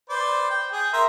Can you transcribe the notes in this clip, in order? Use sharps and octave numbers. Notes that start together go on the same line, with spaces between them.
B4 C5 D5
G5
G#4 G5
A#4 E5 C6